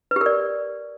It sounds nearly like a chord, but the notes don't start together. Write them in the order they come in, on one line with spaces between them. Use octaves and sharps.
B4 G4 A#4 D5